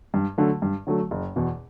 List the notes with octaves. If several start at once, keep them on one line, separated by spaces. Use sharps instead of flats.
G2
D3 F#3 A3
G2
D3 F#3 A3
F#1
E2 B2